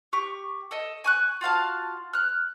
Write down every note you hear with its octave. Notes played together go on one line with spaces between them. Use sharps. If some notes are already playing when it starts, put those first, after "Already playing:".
G4 C#6
A4 D#5
G#5 C#6 F#6
F4 F#4 F5 A5
F6 F#6